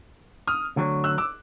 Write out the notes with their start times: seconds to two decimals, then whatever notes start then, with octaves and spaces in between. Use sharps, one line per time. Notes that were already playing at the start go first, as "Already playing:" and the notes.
0.47 D#6 F6
0.76 D2 D3 F#3
1.04 E6 F#6
1.18 D6 E6